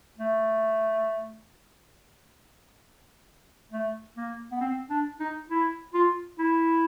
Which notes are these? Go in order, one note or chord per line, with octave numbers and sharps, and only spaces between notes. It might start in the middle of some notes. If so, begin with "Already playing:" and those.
A3
A3
A#3
B3
C4
D4
D#4
E4
F4
E4